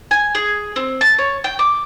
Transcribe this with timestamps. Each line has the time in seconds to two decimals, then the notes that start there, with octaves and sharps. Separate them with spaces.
0.11 G#5
0.35 G#4
0.76 C4
1.01 A5
1.18 C#5
1.44 G5
1.59 D6